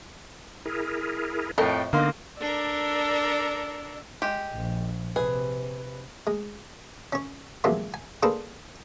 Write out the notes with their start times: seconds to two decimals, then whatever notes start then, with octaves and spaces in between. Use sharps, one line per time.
0.66 E4 G#4 A#4
1.58 F2 A2 A4 A#4 D#5 G5
1.93 D3 A#3 B3 D#4 D#5 F5 C6
2.40 D4 A4 A#4 D5 E6
4.22 G#3 G4
4.53 A#1
5.16 C3 G#4 B4
6.27 G#3
7.13 C#4 C#5
7.64 F2 C3 E3 F#3 G#3 A#3
7.94 G#5
8.23 A#3 D4 G#4 A4 B4 C5